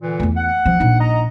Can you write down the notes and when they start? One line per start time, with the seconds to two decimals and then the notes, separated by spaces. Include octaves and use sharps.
0.02 A#2 D3 E3
0.20 E2 A3
0.37 F#5
0.65 F3 C4
0.80 A#1 D#4
1.00 D#5 A#5